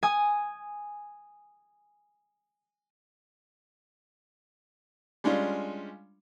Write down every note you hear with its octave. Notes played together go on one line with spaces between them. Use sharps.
G#5 D#6
G3 G#3 C#4 D4 F4